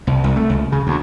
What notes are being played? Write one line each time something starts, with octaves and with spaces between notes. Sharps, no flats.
C2
C2
A3
C#2
C#3
D2